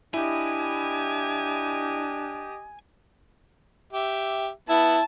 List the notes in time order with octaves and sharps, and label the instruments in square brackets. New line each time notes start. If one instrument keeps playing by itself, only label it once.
[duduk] D4 [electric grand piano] E4 [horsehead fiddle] G4 D#5 [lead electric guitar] G#5
[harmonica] G4 E5
[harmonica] B3 [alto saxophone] E4 [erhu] A5